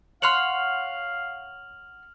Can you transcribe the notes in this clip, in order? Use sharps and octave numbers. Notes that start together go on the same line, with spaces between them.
C#5 F5 F#5 C6 F6 F7 F#7